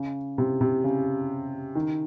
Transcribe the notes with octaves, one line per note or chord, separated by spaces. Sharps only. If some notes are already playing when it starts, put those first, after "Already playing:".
Already playing: C#3
C3
C3
C#3
D#3